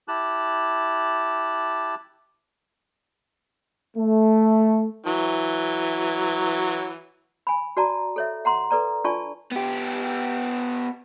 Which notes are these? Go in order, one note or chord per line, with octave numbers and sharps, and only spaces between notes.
E4 G4 A5 F#6
A3
E3 F#3
G#5 B5
F#4 D5 A5 A#5
A4 C#5 E5
F#5 A#5 C6
A4 B4 D5 A#5
D4 F4 D5 G#5 A5 C#6
B3 G4